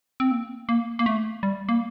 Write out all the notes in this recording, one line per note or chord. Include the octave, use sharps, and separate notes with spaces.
C4
A#3
A#3
A#3
A3
G3
A#3